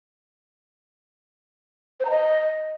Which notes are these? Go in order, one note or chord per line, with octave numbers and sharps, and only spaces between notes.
C5
A#5
D#5